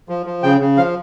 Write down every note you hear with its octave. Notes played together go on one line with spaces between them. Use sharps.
F3
F3
C#3 G5
C#3
F3 F5